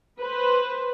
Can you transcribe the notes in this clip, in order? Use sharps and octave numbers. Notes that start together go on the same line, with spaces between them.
B4 C5